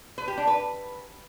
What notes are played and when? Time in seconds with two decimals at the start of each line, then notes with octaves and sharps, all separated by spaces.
0.18 B4
0.28 G4
0.37 D4
0.47 B4